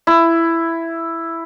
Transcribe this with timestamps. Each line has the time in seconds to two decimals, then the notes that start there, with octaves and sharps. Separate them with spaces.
0.07 E4